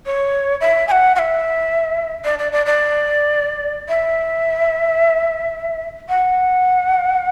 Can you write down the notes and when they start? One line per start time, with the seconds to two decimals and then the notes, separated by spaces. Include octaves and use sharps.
0.06 C#5
0.61 E5
0.88 G#5
0.91 F#5
1.15 F#5
1.19 E5
2.25 D5
2.39 D5
2.52 D5
2.66 D5
3.88 E5
6.09 F#5